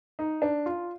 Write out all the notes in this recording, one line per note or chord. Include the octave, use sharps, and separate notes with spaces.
D#4
D4
F4